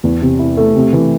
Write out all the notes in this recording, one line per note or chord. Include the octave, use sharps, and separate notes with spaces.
E2
C3
E4
A3
C3
E3